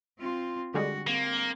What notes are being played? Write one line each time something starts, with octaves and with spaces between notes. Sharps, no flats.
C4 F4
D3 G3 G#3 F#4
A#3 C4